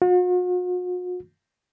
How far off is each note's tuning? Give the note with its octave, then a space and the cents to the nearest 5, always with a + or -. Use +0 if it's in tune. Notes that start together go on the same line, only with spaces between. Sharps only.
F#4 -45